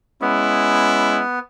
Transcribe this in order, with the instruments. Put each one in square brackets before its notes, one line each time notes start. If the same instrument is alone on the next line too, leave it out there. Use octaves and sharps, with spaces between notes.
[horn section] G#3 C#4 E4 [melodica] B3